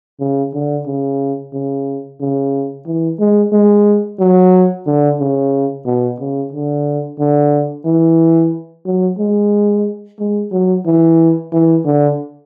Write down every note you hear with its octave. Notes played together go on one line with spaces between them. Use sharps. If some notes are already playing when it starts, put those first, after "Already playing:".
C#3
D3
C#3
C#3
C#3
E3
G#3
G#3
F#3
D3
C#3
B2
C#3
D3
D3
E3
F#3
G#3
G#3
F#3
E3
E3
D3